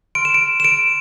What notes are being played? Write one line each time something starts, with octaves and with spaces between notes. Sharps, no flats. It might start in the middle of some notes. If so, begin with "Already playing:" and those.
C6 F6 D7
E7
D7
E7
D7